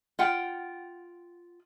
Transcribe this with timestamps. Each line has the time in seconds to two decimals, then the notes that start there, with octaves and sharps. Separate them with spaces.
0.19 F4 F#5 G5